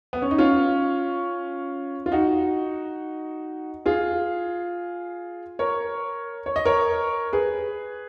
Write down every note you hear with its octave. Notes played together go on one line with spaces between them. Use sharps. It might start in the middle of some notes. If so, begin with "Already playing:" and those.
B3
C#4
D#4
C#4 F4
F4
D#4 F#4
F4 G#4
A#4 C#5
C#5
D#5
A#4 C#5
G#4 B4